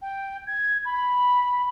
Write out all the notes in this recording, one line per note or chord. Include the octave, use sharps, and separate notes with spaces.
G5
G#6
B5